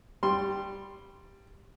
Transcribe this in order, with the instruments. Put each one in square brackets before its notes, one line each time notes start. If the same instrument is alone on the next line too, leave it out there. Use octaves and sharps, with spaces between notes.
[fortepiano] G3 C6